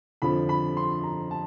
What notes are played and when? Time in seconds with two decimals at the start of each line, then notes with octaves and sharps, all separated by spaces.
0.22 F2 D3 F3 B5
0.49 B5
0.77 C6
1.03 A#5
1.31 A5